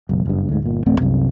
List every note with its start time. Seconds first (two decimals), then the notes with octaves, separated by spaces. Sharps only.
0.09 F#1 B1
0.26 F#1 G2
0.49 D2 G#2
0.62 G1 A#2
0.86 D1 A1 A3 C4
1.00 C2 F#2 C3